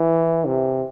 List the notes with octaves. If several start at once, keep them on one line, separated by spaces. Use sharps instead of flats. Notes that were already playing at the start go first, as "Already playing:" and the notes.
Already playing: E3
C3